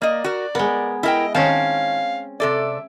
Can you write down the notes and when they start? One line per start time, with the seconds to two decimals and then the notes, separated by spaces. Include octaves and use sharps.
0.02 A#3 D5 D#5
0.24 F#4 A#4
0.55 G#3 B3 A#4
1.03 E4 A#4 D#5 G5
1.35 D#3 C4 C#4 F5 A5
2.40 C3 A4 D5 E5